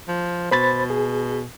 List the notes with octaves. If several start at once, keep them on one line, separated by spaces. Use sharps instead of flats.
F3
B2 C5 B5 A6
G#4